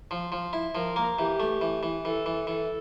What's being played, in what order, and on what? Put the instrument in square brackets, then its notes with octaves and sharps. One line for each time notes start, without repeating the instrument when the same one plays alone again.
[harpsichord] F3
F3
E4
[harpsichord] F3 [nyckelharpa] A#4
[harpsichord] A#3
[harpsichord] E3 [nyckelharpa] G4
[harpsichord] A3
E3
E3
[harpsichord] E3 [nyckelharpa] A4
[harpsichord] E3
[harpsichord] E3 [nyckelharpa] A4